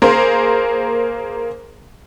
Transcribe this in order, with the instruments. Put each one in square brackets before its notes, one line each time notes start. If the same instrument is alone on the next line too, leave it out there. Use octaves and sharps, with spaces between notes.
[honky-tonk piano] A#3 G#4 A#4 C5